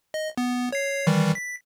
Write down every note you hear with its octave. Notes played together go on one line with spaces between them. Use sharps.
D#5
B3
C#5 C7
D#3 E3 G3
B6